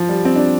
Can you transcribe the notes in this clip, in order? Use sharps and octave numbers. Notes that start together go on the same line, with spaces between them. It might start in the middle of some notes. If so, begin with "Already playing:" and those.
Already playing: F3
G3
C4
D4